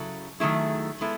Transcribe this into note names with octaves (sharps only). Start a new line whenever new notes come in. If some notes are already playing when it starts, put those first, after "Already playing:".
Already playing: C#3 F#3 E4 A4
D#3 F#3 A3 E4 G#4
G#3 B3 E4 A4